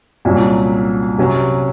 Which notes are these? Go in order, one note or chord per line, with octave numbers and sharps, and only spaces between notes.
C2 A#2 F#3 C#4
C3 F#3 C#4